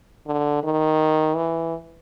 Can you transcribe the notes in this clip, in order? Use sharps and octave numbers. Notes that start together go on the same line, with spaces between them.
D3
D#3
E3